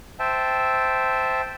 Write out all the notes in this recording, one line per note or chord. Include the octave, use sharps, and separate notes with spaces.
C5 E5 G5 A5